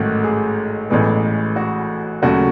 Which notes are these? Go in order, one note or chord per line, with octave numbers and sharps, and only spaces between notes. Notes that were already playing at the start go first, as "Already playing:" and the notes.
Already playing: A1 G#2 D#3 F#3 A3 F#4
G#4
A1 A2 E3 G#3 B3 G#4
F#4
D#2 C#3 F#3 A3 F#4